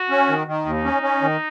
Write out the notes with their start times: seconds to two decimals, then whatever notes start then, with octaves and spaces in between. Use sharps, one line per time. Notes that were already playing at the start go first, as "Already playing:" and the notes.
Already playing: F#4
0.10 C#4
0.29 D#3
0.47 D#3
0.65 D#2 D#4
0.84 C#4
1.02 C#4
1.22 D#3